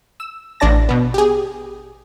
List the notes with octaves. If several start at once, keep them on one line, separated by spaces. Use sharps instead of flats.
E6
A1 D4 D5 A5 A#6
B2 B3
G4 G#4